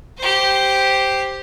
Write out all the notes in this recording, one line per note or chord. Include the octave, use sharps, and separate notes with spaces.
G4 C5